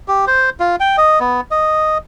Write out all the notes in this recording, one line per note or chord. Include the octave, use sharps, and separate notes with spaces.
G4
C5
F4
G5
D#5
B3
D#5